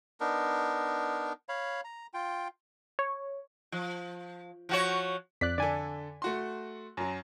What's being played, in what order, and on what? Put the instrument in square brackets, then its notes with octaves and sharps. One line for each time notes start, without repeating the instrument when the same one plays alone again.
[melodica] B3 D4 D#4 A#4
C#5 F5 B5
A#5
F4 G5
[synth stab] C#5
[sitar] F3
F3 F#4 C#5
[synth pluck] F2 D5 F#6 [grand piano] B6
[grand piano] D3 A4 [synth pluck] D5 G#5
[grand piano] A3 F#4 C6
F#2 F#3